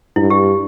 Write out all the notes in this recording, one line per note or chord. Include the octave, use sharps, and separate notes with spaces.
G2 E4
G4